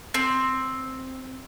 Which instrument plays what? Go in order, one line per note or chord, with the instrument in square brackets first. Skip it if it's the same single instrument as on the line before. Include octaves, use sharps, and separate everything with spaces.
[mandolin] C4